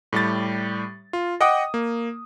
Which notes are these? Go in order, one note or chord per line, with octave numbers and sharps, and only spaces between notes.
A2 G3 G4 A6
F4
D#5 F#5 G5 D6 D#6
A#3